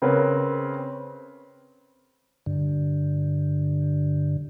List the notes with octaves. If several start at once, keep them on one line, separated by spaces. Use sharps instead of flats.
C#3 C4 A#4 B4 C#5
G2 D3